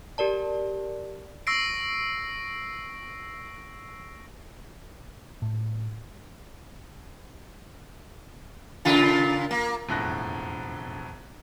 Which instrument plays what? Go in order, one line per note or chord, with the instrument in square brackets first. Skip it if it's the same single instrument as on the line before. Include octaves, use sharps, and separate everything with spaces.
[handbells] G4 A#4 D5 A5
[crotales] C#6 E6 A#6 C7 D7
[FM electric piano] A2
[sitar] A#2 C#3 F4
A#3
[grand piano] E1 F2 A2 D3 F#6 A#6